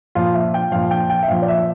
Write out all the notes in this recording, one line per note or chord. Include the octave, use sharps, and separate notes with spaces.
A#2 F3 F4
E5
G5
A#2 F3 F5
G5
G5
E5
A#2 F3 F5
D5
E5